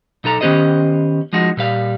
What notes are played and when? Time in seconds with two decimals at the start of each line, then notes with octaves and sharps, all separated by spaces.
0.24 B1 D#4 A4 A#5
0.41 D#3 B3 C#4 G4 C5 D#5
1.33 F3 G#3 D#4 F#4
1.57 A#2 G3 F5